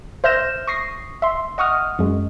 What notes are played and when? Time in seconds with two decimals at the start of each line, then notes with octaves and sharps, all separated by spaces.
0.24 C5 E5 F6 G6 A#6 E7
0.67 C#6 D#6 A#6 C7
1.22 E5 C6
1.58 D#5 F#5 C#6 D#6 F6
1.99 F#2 G#3